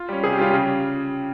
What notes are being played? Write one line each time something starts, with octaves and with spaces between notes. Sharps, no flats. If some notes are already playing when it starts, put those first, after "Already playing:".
Already playing: F4
G3 C#4
C3 G#4
G4
G3 C#4 F4
C#3 G4